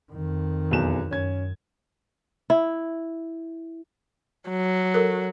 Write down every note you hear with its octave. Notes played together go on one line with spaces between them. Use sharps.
F2 D#3
B1 E2 E7
F#2 C#4 G#6
E4
F#3
A4 A#4